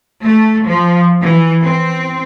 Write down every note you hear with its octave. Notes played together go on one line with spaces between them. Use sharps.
A3
F3
E3
C4